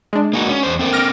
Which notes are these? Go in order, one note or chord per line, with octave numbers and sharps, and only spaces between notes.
G#3 D4
A#3 D#4 F#4
C#4
E2 C5
C4 A4 A#4
F6 A#6 D7